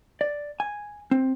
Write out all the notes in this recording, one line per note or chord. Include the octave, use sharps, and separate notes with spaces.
D5
G#5
C4